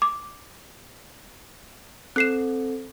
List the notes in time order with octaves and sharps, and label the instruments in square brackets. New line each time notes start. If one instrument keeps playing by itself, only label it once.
[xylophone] D6
[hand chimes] C4 A4 [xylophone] F#6 C7 E7